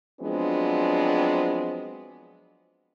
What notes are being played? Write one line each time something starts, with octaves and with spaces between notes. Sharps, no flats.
F3 F#3 G#3 B3 C4 D4